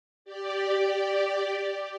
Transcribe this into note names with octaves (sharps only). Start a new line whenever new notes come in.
G4 D5